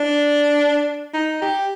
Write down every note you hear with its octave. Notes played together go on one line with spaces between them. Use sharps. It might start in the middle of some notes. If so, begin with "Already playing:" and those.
Already playing: D4
D#4
G4